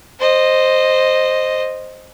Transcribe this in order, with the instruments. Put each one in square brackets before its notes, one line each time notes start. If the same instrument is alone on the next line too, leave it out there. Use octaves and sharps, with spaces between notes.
[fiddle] C5 D#5